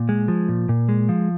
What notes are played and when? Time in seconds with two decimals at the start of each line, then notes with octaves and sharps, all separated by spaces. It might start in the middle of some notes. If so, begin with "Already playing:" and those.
Already playing: A#2
0.09 G#3
0.28 F3
0.49 A#2
0.69 A#2
0.89 G#3
1.09 F3